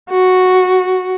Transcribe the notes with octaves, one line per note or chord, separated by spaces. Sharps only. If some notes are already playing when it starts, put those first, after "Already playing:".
F#4